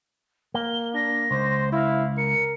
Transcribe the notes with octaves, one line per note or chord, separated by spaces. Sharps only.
A#3 G7
D4 A#6
C#2 C5
E4 F5
A#4 C#7